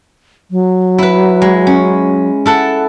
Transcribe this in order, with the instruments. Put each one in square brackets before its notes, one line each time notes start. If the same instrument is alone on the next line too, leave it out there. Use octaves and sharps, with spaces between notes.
[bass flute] F#3
[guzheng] E4 B4
G#3
C#4
E4 A4 F#5